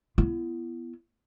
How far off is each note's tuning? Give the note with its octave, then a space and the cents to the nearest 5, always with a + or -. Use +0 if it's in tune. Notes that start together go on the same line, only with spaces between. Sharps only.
B3 +0 E4 +35